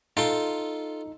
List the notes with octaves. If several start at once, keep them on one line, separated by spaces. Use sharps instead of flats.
D#4 F4 A4 C6